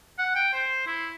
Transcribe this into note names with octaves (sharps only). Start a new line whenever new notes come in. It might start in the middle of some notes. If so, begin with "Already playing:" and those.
F#5
G5
C5
E4